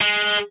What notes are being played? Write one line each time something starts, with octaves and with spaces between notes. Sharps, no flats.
G#3